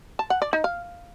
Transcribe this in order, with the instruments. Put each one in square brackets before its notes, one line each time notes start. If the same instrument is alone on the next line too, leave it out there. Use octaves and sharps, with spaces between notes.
[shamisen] A5
F#5
D5
D#4
F5